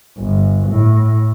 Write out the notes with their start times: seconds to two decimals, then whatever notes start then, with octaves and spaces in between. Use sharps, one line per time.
0.18 G1
0.70 A2